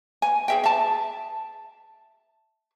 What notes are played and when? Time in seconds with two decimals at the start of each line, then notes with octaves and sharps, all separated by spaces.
0.22 G#5
0.48 G#4 E5 G5
0.64 E5 A5